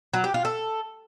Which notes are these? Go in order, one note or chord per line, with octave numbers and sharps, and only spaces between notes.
F#3
G4
F4
A4